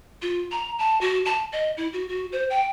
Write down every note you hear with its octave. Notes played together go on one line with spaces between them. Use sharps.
F4
A#5
A5
F#4
A5
D#5
E4
F#4
F#4
C5
G5